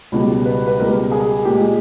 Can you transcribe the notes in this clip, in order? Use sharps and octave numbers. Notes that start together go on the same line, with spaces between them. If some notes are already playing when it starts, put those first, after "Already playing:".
C#2 B2 G3
B4
B4
C#2 B2 G3 A#4
G#4
A#2 G#3 G4